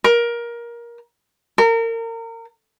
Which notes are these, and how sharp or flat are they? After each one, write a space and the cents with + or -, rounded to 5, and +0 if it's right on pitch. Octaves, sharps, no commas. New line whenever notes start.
A#4 +20
A#4 -30